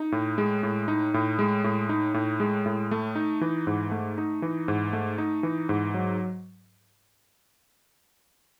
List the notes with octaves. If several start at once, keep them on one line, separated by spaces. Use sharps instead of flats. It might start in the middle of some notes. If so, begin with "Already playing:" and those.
Already playing: D#4
A2
G#3
A2
D#4
A2
G#3
A2
D#4
A2
G#3
A2
A3
D#4
E3
G#2
A3
D#4
E3
G#2
A3
D#4
E3
G#2
F#3